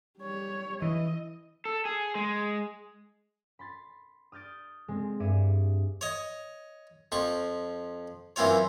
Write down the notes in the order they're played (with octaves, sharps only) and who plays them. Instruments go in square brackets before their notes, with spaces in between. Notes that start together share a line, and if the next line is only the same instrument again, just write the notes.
[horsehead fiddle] G3 C#5
[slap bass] E3 [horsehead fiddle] D#5
[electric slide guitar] A4
G#4
G#3
[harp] B5 C6 A6 B6
D#6 F6 G6 A6 D7
G#3 C4
G2 G#4 E5 D6 C#7 D#7
[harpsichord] C#5 D#5
F2 F3 C#6
F#2 E3 C4 F4 C#5